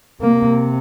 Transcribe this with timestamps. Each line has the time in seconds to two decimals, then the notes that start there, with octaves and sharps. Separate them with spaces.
0.22 C3 A#3